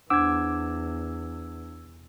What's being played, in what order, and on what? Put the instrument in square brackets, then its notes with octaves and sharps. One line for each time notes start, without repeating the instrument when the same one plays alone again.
[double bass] E2 [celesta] D4 C5 F#5 [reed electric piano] D6 [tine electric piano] E6 G#6